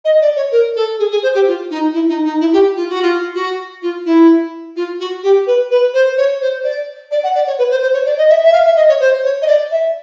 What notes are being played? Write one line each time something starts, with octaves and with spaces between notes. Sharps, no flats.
D#5
D5
C#5
A#4
A4
G#4
G#4
C5
G4
F4
D#4
E4
D#4
D#4
E4
G4
F4
F#4
F4
F#4
F4
E4
F4
F#4
G4
B4
B4
C5
C#5
C5
D5
D5
F#5
D5
C#5
B4
C5
C5
C#5
D5
D#5
E5
E5
F5
E5
D#5
C#5
C5
C#5
D#5
D5
E5